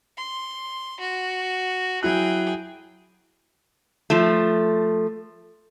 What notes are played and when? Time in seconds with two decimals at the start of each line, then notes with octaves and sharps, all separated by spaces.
0.17 C6
1.00 F#4
2.03 F#3 E4 G#4 G5 F#6
4.10 F3 A3